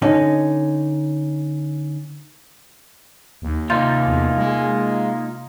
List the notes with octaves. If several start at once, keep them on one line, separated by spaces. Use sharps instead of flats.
D3 C#4 D#4
D#2
C3 A#3 D#4 F4 G6 A6
E2
G#3